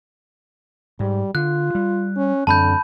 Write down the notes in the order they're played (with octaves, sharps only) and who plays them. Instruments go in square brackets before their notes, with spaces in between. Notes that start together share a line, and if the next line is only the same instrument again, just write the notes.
[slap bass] G#2 [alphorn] G3
[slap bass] D3 [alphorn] F4 [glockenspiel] F#6
[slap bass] G3
[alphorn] C#4
[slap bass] F#2 C4 [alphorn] D3 [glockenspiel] A5 B5 G6